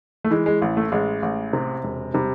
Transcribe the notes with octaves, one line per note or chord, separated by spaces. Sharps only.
A3
E3 G#3
G#3
A1
A3
A1 G#3
A1
C3
E1
C3 G3